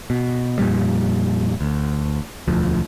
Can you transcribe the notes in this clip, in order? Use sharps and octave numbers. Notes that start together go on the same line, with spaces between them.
B2
F2 A#2 G3
D2
E1 D2 F3